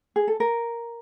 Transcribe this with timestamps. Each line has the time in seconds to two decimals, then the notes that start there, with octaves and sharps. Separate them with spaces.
0.16 G#4
0.28 A4
0.40 A#4